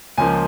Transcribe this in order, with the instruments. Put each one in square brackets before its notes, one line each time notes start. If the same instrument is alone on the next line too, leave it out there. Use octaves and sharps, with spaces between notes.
[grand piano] C#2 C#3 F3 A#3 G#5